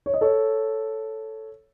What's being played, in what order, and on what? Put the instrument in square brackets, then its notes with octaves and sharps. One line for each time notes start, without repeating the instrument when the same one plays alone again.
[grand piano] C#5
D#5
A4 C#5